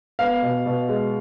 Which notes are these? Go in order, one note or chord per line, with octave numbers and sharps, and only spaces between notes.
B3 F5
B2
B2
G#3